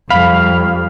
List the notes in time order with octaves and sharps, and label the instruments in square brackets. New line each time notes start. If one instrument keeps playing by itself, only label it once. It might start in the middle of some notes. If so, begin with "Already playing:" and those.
[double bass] F2 G3 [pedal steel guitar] F5 [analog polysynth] B5